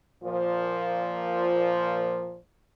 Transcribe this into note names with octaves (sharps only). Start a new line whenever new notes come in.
A#2 F3